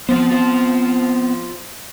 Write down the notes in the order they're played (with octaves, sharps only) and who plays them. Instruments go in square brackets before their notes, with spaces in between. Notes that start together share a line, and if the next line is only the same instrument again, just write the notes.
[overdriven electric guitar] F3 C5 [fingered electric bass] B3 C4
[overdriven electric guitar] F4 C5